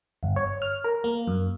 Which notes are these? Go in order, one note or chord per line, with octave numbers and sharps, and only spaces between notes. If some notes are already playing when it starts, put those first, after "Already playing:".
G1
C#5
F6
A#4
A#3
F#2